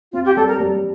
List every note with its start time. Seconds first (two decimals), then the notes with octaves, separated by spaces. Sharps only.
0.13 C4 F4
0.25 G4
0.36 G3 A4
0.48 A#4
0.60 G3